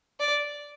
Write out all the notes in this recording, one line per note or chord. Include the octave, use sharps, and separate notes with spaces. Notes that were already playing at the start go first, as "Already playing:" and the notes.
D5